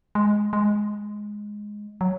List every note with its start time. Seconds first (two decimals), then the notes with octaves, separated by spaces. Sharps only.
0.15 G#3
0.53 G#3
2.01 F#3